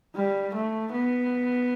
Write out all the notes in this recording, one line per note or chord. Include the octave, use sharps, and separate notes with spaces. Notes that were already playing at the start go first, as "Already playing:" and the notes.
G3
A3
B3